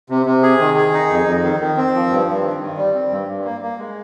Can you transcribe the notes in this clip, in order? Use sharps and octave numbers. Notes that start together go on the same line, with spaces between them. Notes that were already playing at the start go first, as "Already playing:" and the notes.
C3
C3
G#4
D#3
G#4
D#4
F2
F2
D#3
D#3
C4
F3
G2
G2
D#3
D#3
G3
C4
G2
G2
A#3
A#3
G#3